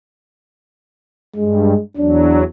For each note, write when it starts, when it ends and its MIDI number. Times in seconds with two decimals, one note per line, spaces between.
1.36 1.74 43
1.36 1.81 56
1.97 2.43 40
1.97 2.43 54
1.97 2.40 62